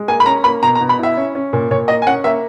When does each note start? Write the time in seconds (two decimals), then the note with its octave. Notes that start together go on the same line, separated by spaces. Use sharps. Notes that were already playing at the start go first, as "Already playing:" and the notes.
Already playing: G#3
0.08 A#3 G#5
0.20 B5
0.26 C#4 A#5
0.44 A#3 B5
0.63 B2 A#5
0.75 A#5
0.81 B2
0.89 B5
0.99 E4 E5
1.17 C#4
1.35 C#4
1.53 A#2
1.70 A#2 C#5
1.88 A#3 D#5
2.02 G#5
2.07 C#4 F#5
2.24 A#3 E5